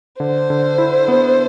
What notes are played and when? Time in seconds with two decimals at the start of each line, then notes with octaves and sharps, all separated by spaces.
0.20 D3 C5
0.50 D3
0.78 E4
1.08 B3